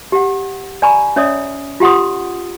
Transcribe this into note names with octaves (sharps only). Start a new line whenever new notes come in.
G4 F#5
D5 G#5 A#5 B5 C#6
C#4 C#5 D5 E5 D#6
F4 G4 F#5 C6 D#6